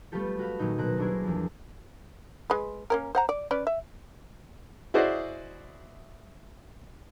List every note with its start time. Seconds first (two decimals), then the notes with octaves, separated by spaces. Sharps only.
0.12 G3 A3 B3 F4 G4 A4
0.39 F#4 G4 F5 B5
0.59 A#2 D#3 F#3 D#4
0.78 B2 A#4 C5 A#5 F#6
0.97 G3 A3 D4 E4 G#4 A#4
1.23 E2 F3
2.50 G#3 B4
2.90 A#3 C#4 A#4
3.15 C5 F#5 A#5
3.29 D5
3.51 C#4 B4 D5
3.67 E5
4.94 E4 F#4 G#4 C5 D5 D#5